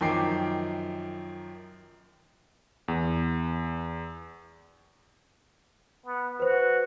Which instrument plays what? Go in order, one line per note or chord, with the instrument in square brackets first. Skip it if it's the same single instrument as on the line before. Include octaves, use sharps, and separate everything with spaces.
[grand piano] F#2 D#3 F3 G5 D6 C7
[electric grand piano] E2
[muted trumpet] B3
[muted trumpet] F#4 [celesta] B4 C5